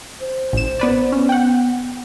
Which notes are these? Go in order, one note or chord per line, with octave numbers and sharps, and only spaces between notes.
C5
A1 E7
B3 B4 D5
B3 C#4
F#5 G5